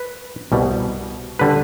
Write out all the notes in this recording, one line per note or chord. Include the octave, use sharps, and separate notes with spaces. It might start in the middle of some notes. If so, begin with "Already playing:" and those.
Already playing: B4
C2 B2 G3
D3 G3 B4